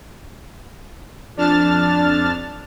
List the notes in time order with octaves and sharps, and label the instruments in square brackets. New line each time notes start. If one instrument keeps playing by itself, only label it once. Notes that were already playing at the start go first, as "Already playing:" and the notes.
[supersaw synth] F2 D4 A5 F6 A6